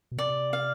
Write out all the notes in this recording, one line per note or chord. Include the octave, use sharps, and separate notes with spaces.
B2
C3 D5
F5